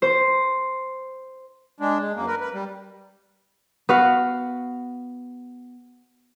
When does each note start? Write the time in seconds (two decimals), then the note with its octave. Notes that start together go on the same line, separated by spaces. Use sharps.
0.02 C5
1.80 G#3 D4
2.00 G#3
2.16 F#2 A#3
2.27 A#4 B4
2.41 B4
2.53 G3
3.89 B3 F#4 F5